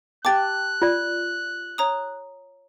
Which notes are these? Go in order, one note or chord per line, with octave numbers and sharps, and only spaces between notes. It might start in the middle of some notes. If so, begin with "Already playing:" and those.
G4 G5 A5 D6 F#6 A6
F4 D5
C#5 A#5 D#6